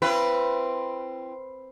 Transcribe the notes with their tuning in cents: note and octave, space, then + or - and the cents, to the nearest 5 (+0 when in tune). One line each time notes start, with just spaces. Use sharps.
C4 +0 E4 +45 B4 +0